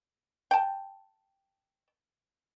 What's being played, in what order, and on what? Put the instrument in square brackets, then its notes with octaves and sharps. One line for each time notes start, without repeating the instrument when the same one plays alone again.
[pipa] G5 A5